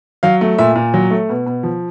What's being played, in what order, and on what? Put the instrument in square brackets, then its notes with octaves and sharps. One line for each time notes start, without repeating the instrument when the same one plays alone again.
[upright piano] F#3 F5
A3
A#2 E5
A#2
F#3
A3
B2
B2
F3